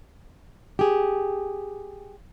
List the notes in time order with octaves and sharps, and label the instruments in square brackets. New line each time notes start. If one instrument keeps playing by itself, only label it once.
[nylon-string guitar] G4 G#4